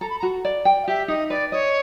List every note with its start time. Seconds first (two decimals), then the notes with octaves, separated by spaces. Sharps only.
0.01 A4 A#5
0.10 B5
0.19 A#5
0.23 F#4
0.45 D5
0.65 G5
0.83 F5
0.87 G4 E5
1.08 D#4 D#5
1.30 B4 D5
1.52 C#5 D#5